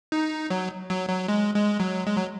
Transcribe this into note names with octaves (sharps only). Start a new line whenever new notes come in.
D#4
F#3
F#3
F#3
G#3
G#3
F#3
G#3
F#3